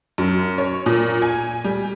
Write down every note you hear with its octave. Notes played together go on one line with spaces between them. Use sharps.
F#2
C#5
A#2
G#5
G3